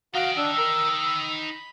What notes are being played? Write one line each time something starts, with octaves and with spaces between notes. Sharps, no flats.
D#4 F#4 F5 G5
D4 E6
A#4
B5